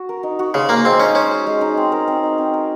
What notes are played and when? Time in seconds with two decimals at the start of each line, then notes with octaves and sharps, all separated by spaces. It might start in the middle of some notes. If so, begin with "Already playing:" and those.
Already playing: F#4
0.09 A#4
0.23 D#4
0.39 F#4
0.54 C#3 C5
0.69 A#3 G#4
0.85 G#3 C4
1.00 C#4 D#4
1.15 C#4 C5
1.31 G#4
1.46 G#3
1.61 D#4
1.77 C4
1.92 A#4
2.08 C4
2.23 D#4
2.38 C4
2.54 A#4